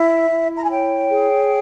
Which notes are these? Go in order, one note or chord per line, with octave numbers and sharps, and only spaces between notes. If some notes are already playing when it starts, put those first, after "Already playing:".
Already playing: E4 E5
E4
A#5
G#5
C#5 G5
G#4